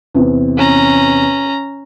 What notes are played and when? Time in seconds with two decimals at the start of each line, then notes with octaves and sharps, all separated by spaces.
0.14 E2 C3 E3
0.57 C#4 A#5